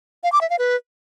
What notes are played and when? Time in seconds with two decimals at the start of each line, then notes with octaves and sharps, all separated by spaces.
0.23 F5
0.32 D6
0.41 E5
0.50 F5
0.59 B4